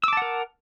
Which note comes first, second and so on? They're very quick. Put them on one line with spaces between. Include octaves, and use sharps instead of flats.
E6 D6 A5 F#5 A#4